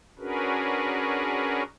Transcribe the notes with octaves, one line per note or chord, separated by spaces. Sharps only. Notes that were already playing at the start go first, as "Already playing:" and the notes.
C#4 D4 F#4 G#4 A#4 B4